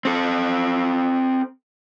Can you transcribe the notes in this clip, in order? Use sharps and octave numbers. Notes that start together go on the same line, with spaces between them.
C4 A4